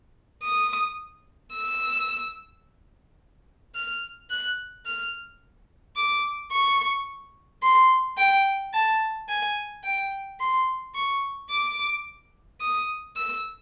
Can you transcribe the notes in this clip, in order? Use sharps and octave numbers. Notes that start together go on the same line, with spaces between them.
D#6
E6
F6
F#6
F6
D6
C#6
C6
G5
A5
G#5
G5
C6
C#6
D6
D#6
E6